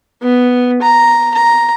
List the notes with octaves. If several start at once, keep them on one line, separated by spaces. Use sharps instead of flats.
B3
A#5
A#5